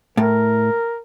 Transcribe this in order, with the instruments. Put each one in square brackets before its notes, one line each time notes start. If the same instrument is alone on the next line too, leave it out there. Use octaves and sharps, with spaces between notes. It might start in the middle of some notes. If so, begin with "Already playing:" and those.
[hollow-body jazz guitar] A2 [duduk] A#4